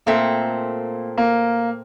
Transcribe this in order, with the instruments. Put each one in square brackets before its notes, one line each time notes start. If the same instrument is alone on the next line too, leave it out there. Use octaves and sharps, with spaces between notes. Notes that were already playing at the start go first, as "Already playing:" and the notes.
[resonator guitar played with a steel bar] A#2 A3 C4 [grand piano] A#3
[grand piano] A#3